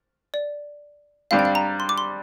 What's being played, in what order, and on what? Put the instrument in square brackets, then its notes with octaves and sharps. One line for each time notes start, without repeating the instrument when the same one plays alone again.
[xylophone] D5
[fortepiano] G2 G3 C4 [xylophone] F5
[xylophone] G5
F5
A#5
C6
D6
C6